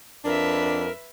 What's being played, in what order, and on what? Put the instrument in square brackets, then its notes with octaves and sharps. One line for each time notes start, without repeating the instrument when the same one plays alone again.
[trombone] F2 [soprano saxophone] D4 [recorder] A#4 [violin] B4 E5